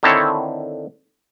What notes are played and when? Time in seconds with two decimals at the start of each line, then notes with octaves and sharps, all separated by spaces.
0.03 D3 D#3 C4 E4 A4 C#5